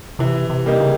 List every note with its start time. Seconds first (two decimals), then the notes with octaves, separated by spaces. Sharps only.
0.19 C3 E3
0.50 C3
0.66 G3 A#3 D#4
0.80 C#3